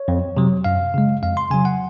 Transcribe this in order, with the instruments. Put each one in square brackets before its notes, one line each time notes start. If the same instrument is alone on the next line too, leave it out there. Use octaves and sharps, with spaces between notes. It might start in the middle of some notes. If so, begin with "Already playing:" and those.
Already playing: [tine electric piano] C#5
F2
C3 F#3
F#2 F5
C#3 G#3
F2 F5
C6
C#3 F#3 G#5
F#5